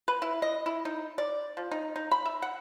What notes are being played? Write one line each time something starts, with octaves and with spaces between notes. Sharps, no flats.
B4
E4
D#5
E4
D#4
D5
F3
D#4
D#4
B5
E5
F#5